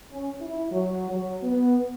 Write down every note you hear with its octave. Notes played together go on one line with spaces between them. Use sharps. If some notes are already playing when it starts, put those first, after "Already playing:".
C#4
E4
F#3
F#3
B3